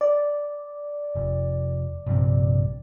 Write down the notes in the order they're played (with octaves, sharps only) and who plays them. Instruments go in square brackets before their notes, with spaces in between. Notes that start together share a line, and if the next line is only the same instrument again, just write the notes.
[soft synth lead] D5
[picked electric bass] F1
A#1 G2 C3